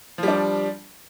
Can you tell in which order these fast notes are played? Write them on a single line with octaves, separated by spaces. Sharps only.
F3 G3 D4